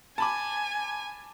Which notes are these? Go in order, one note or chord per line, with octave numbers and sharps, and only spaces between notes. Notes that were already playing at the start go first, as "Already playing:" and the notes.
G#5 A5 B5 D6